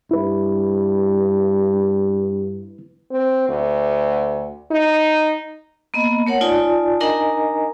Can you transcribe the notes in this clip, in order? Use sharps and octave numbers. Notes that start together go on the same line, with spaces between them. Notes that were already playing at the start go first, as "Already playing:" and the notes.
G2 E4 B4
C4
D2
D#4
A#3 B3 D#5
A3 A#4 C#5 F#5
D#4 F4 D5 G#5 A5
D4 D#4 A#4 D#5 G#5 A#5